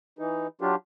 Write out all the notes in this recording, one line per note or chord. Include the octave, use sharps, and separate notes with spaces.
E3 D#4
F#3 D4 F4 G4